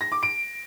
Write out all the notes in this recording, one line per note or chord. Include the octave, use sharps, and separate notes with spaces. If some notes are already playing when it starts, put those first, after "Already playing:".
A#6
D6
D7